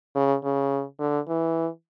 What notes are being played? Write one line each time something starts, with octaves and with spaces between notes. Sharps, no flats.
C#3
C#3
D3
E3